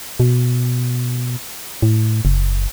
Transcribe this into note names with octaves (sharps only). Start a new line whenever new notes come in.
B2
A2
F#1